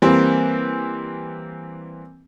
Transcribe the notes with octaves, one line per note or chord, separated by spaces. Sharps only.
E3 G3 A#3 C4